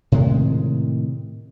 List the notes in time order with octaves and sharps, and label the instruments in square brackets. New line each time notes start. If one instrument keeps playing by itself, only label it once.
[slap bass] A2 C3 D#3 G#3